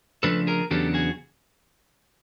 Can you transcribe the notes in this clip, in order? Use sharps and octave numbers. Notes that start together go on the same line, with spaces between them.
C#3 F3 A3 D4 A4 B4
G#4 A#4
E2 C#3 F#3 B3 D4 G4 A4
F#4 G#4